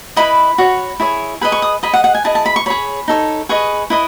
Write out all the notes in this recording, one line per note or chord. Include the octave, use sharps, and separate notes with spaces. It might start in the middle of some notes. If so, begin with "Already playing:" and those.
E4 B4 D#5 B5
F#4 C#5
E4 G#4 C#5
G#4 B4 D#5 B5
C#6
D#6
G#4 D#5 B5
F#5
F#5
G#5
E4 G#4 D#5 A5
A5
B5
C#6
G#4 C#5 B5
D#4 A4 C#5
G#4 B4 D#5 C#6
E4 B4 D#5